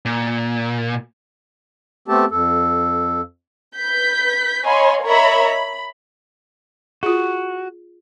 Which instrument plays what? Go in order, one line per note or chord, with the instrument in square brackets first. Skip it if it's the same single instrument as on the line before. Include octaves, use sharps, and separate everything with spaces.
[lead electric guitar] A#2
[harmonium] A3 B3 C4 G4 A4 A5
F2 A4
[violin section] B4 G6 B6
C#5 D#5 F5 G#5 B5 C6
A#4 C#5 D#5 E5 A#5 B5
B5
[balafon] F4 G#4 [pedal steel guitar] F#4